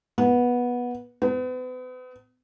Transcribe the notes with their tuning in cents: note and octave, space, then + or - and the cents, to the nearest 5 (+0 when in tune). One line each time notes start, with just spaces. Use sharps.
B3 -15
B3 +40